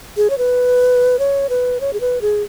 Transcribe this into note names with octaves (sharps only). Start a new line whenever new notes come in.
G#4
C#5
B4
C#5
B4
C#5
G#4
B4
G#4